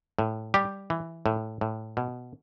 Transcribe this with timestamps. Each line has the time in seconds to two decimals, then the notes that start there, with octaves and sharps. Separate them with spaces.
0.19 A2
0.54 G3 G4
0.90 E3
1.26 A2
1.61 A2
1.97 B2